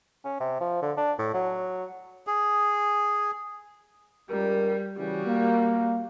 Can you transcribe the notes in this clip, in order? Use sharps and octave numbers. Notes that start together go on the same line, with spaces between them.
C#4
C3
F3
D3
D4
A2
F#3
G#4
C#2 G3 A#4
C#3 E3 G3 F#4
A#3